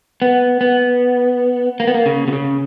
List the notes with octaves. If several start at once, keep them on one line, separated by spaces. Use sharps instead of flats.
B3
B3
A#3
B3
A#3
C#3
B2
C#3